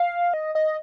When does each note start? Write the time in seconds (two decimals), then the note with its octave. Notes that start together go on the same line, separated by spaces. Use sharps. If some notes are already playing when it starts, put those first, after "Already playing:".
Already playing: F5
0.34 D#5
0.55 D#5